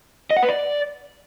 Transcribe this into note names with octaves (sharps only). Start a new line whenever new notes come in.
D#5
F#5
B4
D5